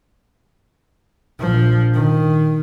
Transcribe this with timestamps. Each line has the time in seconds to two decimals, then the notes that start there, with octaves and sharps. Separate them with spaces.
1.40 A#1 F3
1.94 D#3